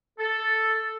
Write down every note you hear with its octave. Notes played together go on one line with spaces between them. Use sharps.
A4